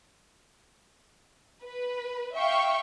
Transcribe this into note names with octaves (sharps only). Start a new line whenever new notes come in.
B4
E5 F5 G5 C#6